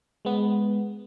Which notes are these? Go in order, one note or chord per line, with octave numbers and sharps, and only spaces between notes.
G#3 B3